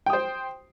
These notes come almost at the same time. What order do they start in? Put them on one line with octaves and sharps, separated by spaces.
G5 D#6 C5